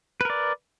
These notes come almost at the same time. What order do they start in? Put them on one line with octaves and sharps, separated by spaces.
B4 A#4 D5